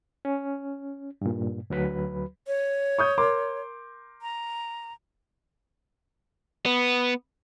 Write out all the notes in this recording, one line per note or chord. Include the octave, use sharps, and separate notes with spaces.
C#4
G2 A#2
D2 F#3 B4 B5
C#5
C#6 D#6 G6
A#4 C6 D6
A#5
B3